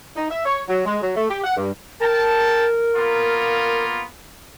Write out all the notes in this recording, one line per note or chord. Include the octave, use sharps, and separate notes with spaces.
D#4
E5
C#5
F#3
G#3
F#3
A3
G4
F#5
G2
A#4 G5 A5
A#3 B3 F4